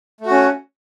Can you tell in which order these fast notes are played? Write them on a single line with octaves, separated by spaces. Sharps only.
A3 F#4 C#4